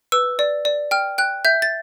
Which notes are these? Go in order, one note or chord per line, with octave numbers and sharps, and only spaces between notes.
B4 E6
D5
D5
G5 F6
G5 F#6
E5 G6
A6